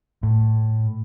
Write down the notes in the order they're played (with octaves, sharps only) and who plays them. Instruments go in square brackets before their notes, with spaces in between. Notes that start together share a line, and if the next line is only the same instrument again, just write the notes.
[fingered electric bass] A2